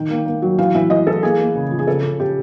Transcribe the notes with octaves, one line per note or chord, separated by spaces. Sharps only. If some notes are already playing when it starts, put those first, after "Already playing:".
Already playing: D#3 G5
A#3
A#3
F#3
E3 F5
E3 E5
E3 D#5
E3 A4
A#3 G#4
A#3
C#3
F3
G#4
C#3 A4
C#3
C#3 G4